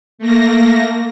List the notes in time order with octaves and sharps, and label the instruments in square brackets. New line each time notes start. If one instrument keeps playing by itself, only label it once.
[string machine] A3 A#3 A#6